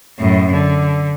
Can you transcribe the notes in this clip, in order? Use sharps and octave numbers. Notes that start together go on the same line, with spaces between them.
F#2 A2
D3